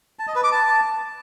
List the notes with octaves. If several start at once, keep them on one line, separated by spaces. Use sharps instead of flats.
A5
D#5
B4
D6
A5